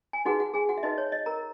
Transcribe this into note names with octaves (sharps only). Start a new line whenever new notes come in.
G#5
D#4 F#4 G#4 B4 F#5
F#4 F#5
G#4 G#5
F#4 F#5
E5
D#4 F#4 B4 D#5
C#5
D#5
A#4 A#5